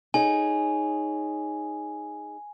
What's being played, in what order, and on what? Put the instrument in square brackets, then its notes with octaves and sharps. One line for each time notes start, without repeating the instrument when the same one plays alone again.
[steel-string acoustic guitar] D#4 G#4 C#5 [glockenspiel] G#5